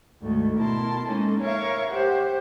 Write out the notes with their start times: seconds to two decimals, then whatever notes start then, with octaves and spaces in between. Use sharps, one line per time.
0.22 D2 G#2 D#3 A3
0.58 B2 E4 A#4 A5 C6
1.08 G#3 A#3 C#4 D#4 A4
1.40 A#4 C#5 E5 F5 C#6
1.90 G4 C5 F#5